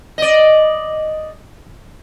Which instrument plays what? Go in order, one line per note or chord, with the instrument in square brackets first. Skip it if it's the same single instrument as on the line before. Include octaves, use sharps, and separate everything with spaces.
[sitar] D5 D#5